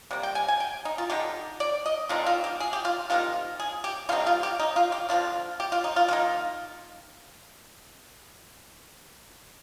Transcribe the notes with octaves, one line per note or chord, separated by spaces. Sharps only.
C3 G3 A#3
G5
G#5
G#5
G5
D#4
F4
D3 G#3 D#4 G4
D5
D#5
D3 G#3 C4 D#4 F4
F4
G4
G#4
G4
F4
C3 D#3 A#3 D#4 F4
G#4
G4
D3 G3 C4 D#4 F4
F4
G4
D#4
F4
G4
D3 F3 C4 F4
G4
F4
D#4
F4
D#3 A#3 D#4 F4